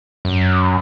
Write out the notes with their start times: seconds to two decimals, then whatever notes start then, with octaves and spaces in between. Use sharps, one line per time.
0.25 F#2